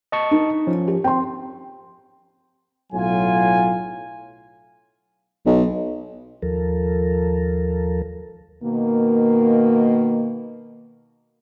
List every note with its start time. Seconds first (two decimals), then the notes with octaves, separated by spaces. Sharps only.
0.12 D#5 A5 C#6
0.31 D#4
0.67 F3 C#4
0.88 G4
1.04 C4 G5 C6
2.93 B1 A2 F#3 F4 G#5
5.46 B1
6.42 D#2 F3 A4 A#4
8.63 B2 D#3 A#3